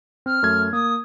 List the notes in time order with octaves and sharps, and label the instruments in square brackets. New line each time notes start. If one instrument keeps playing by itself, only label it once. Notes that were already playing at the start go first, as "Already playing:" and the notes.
[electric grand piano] C4 [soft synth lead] F6
[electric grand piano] F#2 A3 G#6
[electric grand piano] A#3 [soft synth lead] D#6